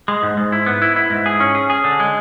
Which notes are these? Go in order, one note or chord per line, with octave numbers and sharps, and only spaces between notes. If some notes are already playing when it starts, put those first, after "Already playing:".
G#3
G#2
G#2
E4
B3
E4
E4
G#2
G#4
C#4
G#4
G#4
D3
G#3